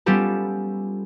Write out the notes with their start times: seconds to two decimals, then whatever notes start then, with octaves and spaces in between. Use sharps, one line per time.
0.06 G3 B3 C#4 F4 G4 A4